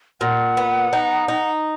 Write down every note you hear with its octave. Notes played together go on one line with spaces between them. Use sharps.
A#2 F#5
B3
D#4
D#4